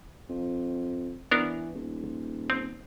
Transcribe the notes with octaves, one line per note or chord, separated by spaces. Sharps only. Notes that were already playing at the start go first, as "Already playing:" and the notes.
F2
E3 B3 D4 A#4
D#1
C4